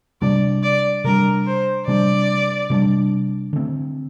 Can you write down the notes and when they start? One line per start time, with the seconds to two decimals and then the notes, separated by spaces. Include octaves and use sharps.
0.21 C3 G3 D4 D5
0.63 D5
1.04 C3 G3 D4 A#4
1.46 C5
1.87 C3 G3 D4 D5
2.70 C3 G3 D4
3.53 D3 A3 C4